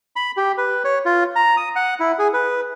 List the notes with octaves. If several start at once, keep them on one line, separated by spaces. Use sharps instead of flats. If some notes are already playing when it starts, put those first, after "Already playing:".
B5
G4
B4
C#5
F4
A#5
D#6
F#5
E4
G#4
B4